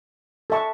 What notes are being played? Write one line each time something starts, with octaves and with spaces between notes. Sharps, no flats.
A4 E5 A5 C#6